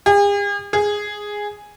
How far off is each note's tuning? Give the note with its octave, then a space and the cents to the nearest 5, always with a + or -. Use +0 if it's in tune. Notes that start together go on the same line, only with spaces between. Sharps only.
G#4 -45
G#4 -5